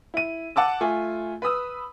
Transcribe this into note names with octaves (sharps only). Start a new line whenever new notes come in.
E4 D#7
F#5 A5 D6 E6
A3 F4 G#5
B4 B5 D#6 E6